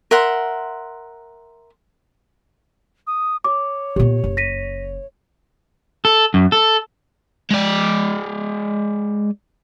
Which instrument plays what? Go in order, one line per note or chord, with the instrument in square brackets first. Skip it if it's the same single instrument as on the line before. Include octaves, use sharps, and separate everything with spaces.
[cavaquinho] A#4 E5 F#5 C6
[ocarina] D#6
[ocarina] C#5 [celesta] D6
[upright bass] A#2 B3 [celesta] G4
[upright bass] F#1
[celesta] A#6 B6 D#7
[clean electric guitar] A4
F#2
A4
[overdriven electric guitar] G#3 D5